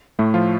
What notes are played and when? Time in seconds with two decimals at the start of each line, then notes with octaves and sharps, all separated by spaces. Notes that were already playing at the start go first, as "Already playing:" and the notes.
0.19 A2 A3
0.34 F3 F4